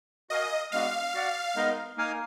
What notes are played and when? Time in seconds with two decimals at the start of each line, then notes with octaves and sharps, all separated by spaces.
0.30 F#4 A#4 D#5 F5 G#5
0.72 G#3 B3 D4 F#4 F5
1.14 F#4 D5 F#5
1.55 G#3 B3 D#4 A#4 D#5
1.97 A#3 D#4 A#4 F5 G#5